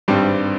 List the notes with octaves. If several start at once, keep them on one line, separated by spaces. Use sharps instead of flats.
G#1 G2 G3 C4 G4